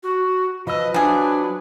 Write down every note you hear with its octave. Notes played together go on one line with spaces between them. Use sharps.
F#4
F3 B4 D#5 E6
F3 F#3 D4 G#4